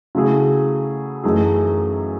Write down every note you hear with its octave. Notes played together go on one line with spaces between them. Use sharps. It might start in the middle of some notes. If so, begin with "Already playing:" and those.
C#3 F#3 A3 E4 G#4
F#2 E3 A3 D#4 G#4